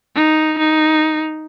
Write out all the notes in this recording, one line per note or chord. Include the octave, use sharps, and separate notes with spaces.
D#4
D#4